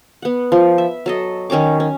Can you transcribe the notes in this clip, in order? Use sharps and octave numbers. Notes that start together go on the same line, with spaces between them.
B3 F#5
F3
E5
F#3 A4 D#5
D#3 C#4 C#5 D6
C#4